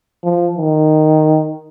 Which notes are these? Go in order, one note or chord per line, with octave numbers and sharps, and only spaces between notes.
F3
D#3